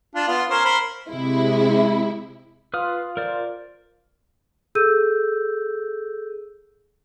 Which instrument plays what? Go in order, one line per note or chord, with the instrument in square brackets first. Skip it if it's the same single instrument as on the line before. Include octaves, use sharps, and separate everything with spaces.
[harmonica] D4 F4
B3 F4
C#4 A#4 C5
A#4 C5 B5
[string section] C3 G#3 E4
[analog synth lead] F4 [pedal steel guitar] B4 D#6 F6
[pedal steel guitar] A#4 C5 D5
[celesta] G#4 A4 E6 G6 D#7